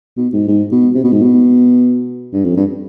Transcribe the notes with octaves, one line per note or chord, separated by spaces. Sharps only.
B2
G#2
G#2
B2
C3
B2
G#2
B2
G2
F2
G2